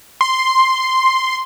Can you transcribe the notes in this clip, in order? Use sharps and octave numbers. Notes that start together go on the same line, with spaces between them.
C6